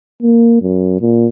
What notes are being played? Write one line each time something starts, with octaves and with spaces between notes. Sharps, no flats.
A#3
F#2
A#2